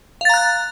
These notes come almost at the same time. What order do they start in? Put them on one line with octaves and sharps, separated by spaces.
F5 A6 A#5 F#6